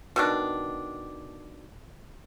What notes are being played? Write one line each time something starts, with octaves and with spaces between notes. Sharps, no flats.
B2 D#3 D4